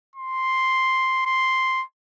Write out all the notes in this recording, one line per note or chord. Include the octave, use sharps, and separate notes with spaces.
C6
C6